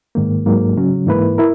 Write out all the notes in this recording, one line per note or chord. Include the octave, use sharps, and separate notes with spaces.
G#2 D#3 A#3
G#2 F#3 A#3
C#3 F#3 C#4
G#2 E3 A#3 E4 B4
E4 A#4